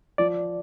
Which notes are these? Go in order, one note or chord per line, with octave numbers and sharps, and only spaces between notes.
F3 D5